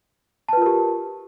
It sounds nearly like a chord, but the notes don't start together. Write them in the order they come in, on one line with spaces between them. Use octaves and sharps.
A5 B4 F4 A#4 G4